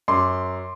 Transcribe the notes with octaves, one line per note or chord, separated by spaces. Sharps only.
F#2 C6 D6